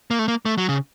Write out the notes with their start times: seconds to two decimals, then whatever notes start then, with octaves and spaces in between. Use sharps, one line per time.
0.11 A#3
0.19 A3
0.28 A#3
0.45 A3
0.58 F#3
0.69 C#3